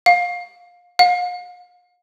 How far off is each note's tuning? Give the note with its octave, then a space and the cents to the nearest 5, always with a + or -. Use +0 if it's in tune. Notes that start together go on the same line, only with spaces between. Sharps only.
F5 +25
F5 +45